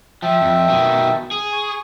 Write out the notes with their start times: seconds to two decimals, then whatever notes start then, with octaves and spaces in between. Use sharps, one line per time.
0.22 F3 E5 G5 A5
0.42 F2
0.69 B2 D#3
1.31 G#4
1.52 G#5 C#6